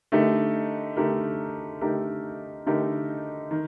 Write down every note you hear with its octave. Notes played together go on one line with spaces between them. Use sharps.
D3 A3 D#4 G4 A#4
D3 A3 D#4 G4 A#4
D3 A3 D#4 G4 A#4
D3 A3 D#4 G4 A#4
D#3